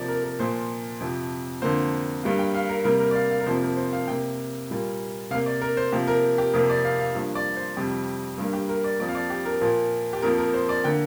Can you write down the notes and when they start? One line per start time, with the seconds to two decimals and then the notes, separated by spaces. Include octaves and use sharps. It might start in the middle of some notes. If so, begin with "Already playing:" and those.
Already playing: C3 F3 A#3 D5
0.08 A#4
0.23 A#4
0.39 A#2 F3 A#3 C5
1.00 F2 C3 F3
1.62 F2 D3 A#3 C5
2.24 G2 G3 A#3
2.39 G5
2.55 F5
2.69 A#4
2.84 C3 G3 A#3 A#4
3.00 A#4
3.11 D5
3.15 F5
3.31 F5
3.41 A#4
3.46 F2 C3 F3 A#3 C5
3.62 A#4
3.77 C5
3.93 F5
4.08 C3 A#3 G5
4.70 A#2 G3 A#3
5.31 C3 F5
5.35 A#3
5.46 D5
5.61 A#4
5.77 C5
5.92 C3 F3 A#3 G4
6.07 A#4
6.38 G4
6.54 F2 C3 A#3 A#4
6.69 D5
6.85 F5
7.00 F5
7.15 G2 F3 A#3
7.35 D5
7.56 C5
7.77 F2 C3 G3 G4
8.38 G2 G3 A#3
8.53 G4
8.69 A#4
8.84 D5
9.00 F2 F3 A#3 D5
9.09 F5
9.15 D5
9.30 G4
9.45 A#4
9.61 A#2 F3 A#3
10.13 G4
10.22 F2 F3 A#3 A#4
10.38 A#4
10.54 C5
10.69 D5
10.84 D3 A#3 G5